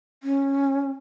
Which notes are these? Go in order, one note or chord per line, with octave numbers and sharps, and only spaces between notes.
C#4